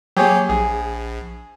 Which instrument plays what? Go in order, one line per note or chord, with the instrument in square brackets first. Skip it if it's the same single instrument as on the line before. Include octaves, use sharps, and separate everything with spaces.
[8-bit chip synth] F#3 A#3 [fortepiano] G4 G#4 C#5
[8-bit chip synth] A#1 [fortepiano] G#4